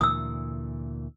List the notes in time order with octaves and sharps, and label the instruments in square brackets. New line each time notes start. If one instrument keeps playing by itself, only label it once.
[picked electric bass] D2 A#2 E3 [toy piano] D#6 E6